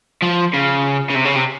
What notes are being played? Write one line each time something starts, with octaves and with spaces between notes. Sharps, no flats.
F3
C#3
C#3
C3
C#3
C3